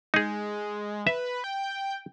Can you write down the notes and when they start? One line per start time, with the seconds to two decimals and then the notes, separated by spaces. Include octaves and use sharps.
0.14 G#3 D#4 G#4
1.07 B4 E5
1.44 G5